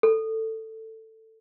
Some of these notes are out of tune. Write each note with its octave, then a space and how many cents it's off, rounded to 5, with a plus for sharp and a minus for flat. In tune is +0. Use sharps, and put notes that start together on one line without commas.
A4 +15